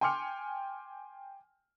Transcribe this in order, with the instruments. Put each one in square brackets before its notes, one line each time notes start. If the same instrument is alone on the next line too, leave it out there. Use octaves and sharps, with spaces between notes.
[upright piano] G5 G#5 C6 D6 F6 C#7